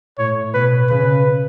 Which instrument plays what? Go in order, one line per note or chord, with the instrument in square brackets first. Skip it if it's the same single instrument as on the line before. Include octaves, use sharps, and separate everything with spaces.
[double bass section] A2 [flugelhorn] C#5
[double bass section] B2 [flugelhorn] B4
[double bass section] C#3 [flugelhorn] B4